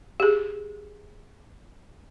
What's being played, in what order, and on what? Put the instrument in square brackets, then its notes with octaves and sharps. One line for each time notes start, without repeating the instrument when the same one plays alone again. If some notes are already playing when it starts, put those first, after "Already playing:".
[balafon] G4 G#4